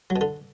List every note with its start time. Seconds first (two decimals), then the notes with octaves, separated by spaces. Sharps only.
0.10 F#3
0.16 B2
0.21 D3